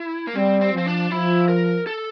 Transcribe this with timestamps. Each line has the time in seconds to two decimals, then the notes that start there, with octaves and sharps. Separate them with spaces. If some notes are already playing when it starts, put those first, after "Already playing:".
Already playing: E4
0.27 A#3
0.35 G3 C4
0.61 C4
0.74 F3 C4
0.87 D4
1.11 F3 E4
1.48 A#4
1.87 A4